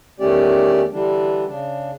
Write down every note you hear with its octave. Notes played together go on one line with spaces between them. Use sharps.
E2 D#3 A3 C#4 G4 D5
D3 E3 G3 D4
C#3 D4